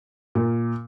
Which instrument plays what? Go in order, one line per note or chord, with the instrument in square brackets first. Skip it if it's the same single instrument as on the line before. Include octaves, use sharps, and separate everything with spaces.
[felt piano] A#2